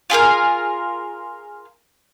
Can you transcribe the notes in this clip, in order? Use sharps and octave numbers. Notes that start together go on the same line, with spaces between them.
F4 G#4 A#4 F5